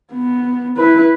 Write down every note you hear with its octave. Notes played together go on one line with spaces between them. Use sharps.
B3
E4 B4